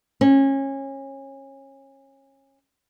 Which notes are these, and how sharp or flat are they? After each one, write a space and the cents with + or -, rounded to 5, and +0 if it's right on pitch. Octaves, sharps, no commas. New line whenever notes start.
C#4 -25